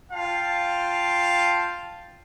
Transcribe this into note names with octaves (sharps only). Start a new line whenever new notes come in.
F4 F5 G5 A5